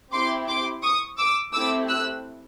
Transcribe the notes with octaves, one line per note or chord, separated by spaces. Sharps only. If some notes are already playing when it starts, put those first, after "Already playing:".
C4 E4 G4 C6 D6
C6 D6
C#6 D#6
D6 E6
A3 C4 E4 G4 D6 E6
E6 F#6